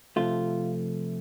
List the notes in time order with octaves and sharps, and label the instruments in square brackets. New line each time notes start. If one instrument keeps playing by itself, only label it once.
[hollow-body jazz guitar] C3 F3 A3 F4